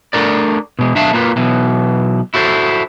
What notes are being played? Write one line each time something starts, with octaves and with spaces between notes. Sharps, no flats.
A3 D4 A#4 D5
B2 G#3
B1 D4 E5 F5 A5
A#3 F4 B4
B1 B2 E3
E4 F#4 A4 C5